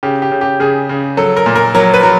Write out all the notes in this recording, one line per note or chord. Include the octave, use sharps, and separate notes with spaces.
C#3 G4
G4
C#3
G4
C#3 G#4
C#3
F#3 A4
A#4
A#2
A#4
F#3 A#4
B4
F#3